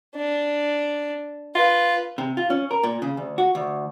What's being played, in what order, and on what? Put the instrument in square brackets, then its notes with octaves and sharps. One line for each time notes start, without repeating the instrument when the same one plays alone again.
[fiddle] D4
[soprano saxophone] F4 [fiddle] B4
[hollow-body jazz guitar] C3
F4
C#4
A#4
A#2
C#3
D2
F#4
D2